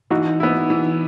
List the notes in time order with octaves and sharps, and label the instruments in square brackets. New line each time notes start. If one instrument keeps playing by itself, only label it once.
[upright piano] E3 [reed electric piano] D#4 F#4
[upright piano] B3 E4
E3